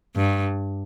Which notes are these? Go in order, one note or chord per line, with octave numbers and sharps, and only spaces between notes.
G2